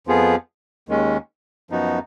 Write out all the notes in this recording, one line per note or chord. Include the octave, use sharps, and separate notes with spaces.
F2 F3 B3 F4 G#4
D#2 D#3 G#3 C#4
F#2 F3 B3 D#4 F#4